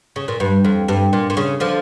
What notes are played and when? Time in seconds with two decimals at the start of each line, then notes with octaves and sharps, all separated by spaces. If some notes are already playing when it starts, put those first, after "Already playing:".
0.16 C#3
0.28 A#2
0.40 G2
0.65 F2
0.88 G2
1.13 A#2
1.30 A#2
1.37 C#3
1.60 D3 F3